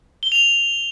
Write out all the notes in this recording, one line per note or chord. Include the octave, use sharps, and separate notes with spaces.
G7
F7